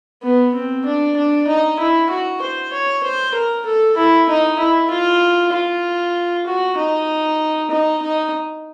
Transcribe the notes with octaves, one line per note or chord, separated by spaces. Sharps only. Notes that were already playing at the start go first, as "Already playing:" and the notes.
B3
C4
D4
D4
D#4
E4
F#4
C5
C#5
C5
A#4
A4
E4
D#4
E4
F4
F4
F#4
D#4
D#4
D#4